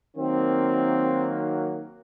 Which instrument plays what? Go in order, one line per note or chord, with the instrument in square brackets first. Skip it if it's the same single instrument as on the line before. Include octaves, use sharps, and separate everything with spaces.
[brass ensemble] D#3 F#3 A#3 [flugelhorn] C4